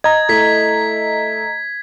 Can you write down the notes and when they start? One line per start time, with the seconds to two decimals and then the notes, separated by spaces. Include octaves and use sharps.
0.04 D#5 A#5 G#6
0.29 A3 E4 G#6 B6